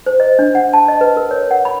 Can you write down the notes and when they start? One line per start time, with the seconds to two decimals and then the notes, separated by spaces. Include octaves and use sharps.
0.06 C5
0.20 D#5
0.39 D4
0.55 F#5
0.73 A5
0.88 D#5
1.01 B4
1.17 A#4
1.31 C#5
1.51 F#5
1.65 B5